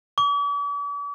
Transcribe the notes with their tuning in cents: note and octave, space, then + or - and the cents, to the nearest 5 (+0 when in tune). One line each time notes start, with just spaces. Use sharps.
D6 -45